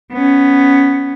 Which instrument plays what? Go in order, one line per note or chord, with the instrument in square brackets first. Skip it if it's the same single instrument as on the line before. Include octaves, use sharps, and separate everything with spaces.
[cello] B3 C#4